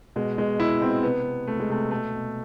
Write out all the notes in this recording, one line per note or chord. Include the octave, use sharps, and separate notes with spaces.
B2 G#3
B2 G#3
B2 E4
B2 C4
C3 B3
C3
C3 A3
G#3
C3 A3
B2 A3
B2